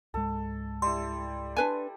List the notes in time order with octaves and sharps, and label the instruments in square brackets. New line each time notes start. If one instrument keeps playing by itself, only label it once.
[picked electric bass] C#2 G#2 G#3 [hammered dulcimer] A4
[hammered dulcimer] G3 E4 [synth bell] C6
[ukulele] D4 B4 G#5